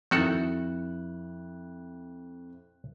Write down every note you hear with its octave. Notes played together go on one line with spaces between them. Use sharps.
F2 D#3 E4 F#4 A4 F#6